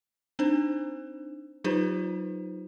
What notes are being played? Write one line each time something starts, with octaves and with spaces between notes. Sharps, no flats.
C4 D4 D#4 C5
F#3 D#4 F4 G4 B4 C5